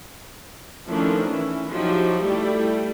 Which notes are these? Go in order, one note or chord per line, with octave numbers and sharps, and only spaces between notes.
D#3 F3 A3 C#4 D4 E4
E3 C#4 E4
F3 F#3 D#4 E4 F#4 G4
G3 A3 E4 G4